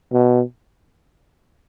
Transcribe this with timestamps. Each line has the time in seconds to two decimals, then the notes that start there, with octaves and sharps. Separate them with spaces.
0.13 B2